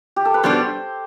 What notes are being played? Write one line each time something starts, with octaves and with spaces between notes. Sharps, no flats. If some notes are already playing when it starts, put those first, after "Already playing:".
G4
A4
B4
B2 G3 B3 D4 C5